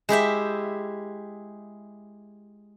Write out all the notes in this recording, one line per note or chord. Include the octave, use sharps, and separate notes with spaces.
G#3 E4 G4 E5